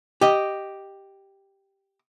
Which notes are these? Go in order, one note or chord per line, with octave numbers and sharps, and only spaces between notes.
G4 D#5